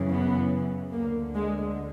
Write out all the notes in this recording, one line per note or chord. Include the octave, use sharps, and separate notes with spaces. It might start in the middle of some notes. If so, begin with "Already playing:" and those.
Already playing: F#2 C#3 E3
B3
D2 D3 A#3
G#3